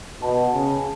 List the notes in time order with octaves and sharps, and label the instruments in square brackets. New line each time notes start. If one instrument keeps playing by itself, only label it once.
[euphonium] B2 [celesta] A5
[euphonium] C#3 [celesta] A5